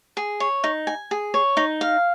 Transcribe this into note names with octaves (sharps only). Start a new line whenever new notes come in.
G#4
C#5
D#4
G#5
G#4
C#5
D#4
F5